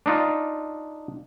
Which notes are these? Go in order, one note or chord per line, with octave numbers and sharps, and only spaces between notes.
D4 D#4 F4